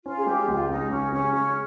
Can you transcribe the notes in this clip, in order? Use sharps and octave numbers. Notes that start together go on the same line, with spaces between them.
C#4 F4
G#4
G#3 G4
C#2 F4
C#3 D#4
C#2 C#4
C#3 C#4
G#3 C#4